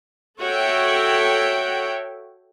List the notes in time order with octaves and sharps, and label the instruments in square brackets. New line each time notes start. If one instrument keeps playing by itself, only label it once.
[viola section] F#4 A4 C#5 E5 G5